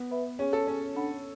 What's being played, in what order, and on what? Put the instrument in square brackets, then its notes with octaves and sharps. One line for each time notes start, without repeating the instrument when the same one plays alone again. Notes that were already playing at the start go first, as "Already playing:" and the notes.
Already playing: [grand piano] B3
[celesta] B4 E5 B5
[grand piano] C#4 [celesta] G#4 C#5 G#5
[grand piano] A4
[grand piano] C#4 [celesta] G#4 C#5 G#5
[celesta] D4 A4 C#5 F#5 B5